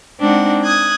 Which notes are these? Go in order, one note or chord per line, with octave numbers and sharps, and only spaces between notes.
G#3 C4 D4 D#4 F#5
D#6 F#6 G#6